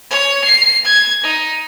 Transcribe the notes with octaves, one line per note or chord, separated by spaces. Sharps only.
C#5
C7
G#6
D#4